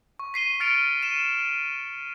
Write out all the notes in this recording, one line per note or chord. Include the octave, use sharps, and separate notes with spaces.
C#6
B6 C7 D#7 G7
F6 A6 C#7 D7 F7
D#7 E7